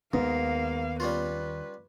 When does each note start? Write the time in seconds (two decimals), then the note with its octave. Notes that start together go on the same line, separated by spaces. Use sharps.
0.13 D#2 G#2 A#3 B3 F5
1.00 G3 C#4 F4 B4